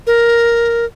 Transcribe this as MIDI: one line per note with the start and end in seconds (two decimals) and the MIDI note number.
0.07 0.85 70